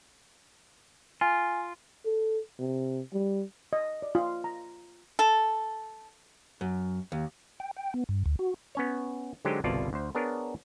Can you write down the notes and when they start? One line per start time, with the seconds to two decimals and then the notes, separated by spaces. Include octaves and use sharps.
1.21 F4 G#5
2.05 A4
2.59 C3
3.13 G3
3.73 D#5
4.02 D5
4.15 F4
4.44 A#5
5.19 A4
6.61 F#2
7.12 D#2
7.60 G5
7.77 G5
7.94 B3
8.09 G2
8.26 D2
8.39 F#4
8.75 B3 C#4 C#5
9.45 D3 F#3 G#3 D#4 G4 C5
9.64 G1 C2 B2 F4 D5 A5
9.93 D2 C5
10.15 B3 D4 G#4 A#4 C#5